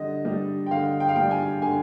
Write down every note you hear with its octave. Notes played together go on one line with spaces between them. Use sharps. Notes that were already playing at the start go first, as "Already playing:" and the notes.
Already playing: D3 G3 D4 D#5
G3 D4
G5
D3 F5
G5
F5
G3 D4 G5
G#5
D3 G#5